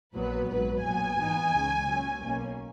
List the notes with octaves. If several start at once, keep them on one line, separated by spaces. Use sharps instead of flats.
A#1 A#2 F#3 B3 B4
A#1 G#2 F#3 B4
B1 A#2 F#3 B3 G#5
G#2 E3 B3 D#4
C#2 C#3 G#3
A#2 F#3 C#4
B1 B2 A#3 C#4